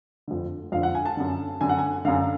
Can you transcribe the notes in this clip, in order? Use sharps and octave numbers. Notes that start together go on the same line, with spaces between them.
F2 D3
F2 D3 F5
F#5
G#5
A5
F#2 D3
F#2 D3 G#5
F#5
G#5
F#2 D3 F5